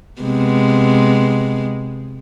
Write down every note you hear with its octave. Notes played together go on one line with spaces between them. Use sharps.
C3 G#3 B3